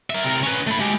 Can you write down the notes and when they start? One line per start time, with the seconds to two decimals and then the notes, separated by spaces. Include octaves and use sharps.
0.10 A#4 E5
0.25 C3 A#4
0.43 C#4 B4
0.67 A3 B5
0.79 G#3 G4